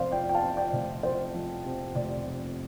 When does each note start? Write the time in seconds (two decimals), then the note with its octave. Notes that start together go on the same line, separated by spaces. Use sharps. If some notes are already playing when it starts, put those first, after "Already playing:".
Already playing: F1 F2 C5 D5 F5
0.12 F3 D5 G5
0.29 G5
0.35 F5 A5
0.42 C3
0.57 D5 G5
0.73 F1
1.03 F2 C5
1.34 F3
1.65 C3
1.95 F1 D5
2.26 F2